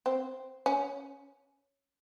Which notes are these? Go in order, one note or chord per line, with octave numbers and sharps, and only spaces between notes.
C4
C#4